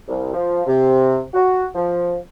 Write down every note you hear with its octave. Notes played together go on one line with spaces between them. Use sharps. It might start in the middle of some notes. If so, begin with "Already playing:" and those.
C2
F3
C3
F#4
F3